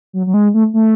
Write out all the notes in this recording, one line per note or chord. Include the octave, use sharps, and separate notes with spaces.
F#3
F#3
G#3
A3
A3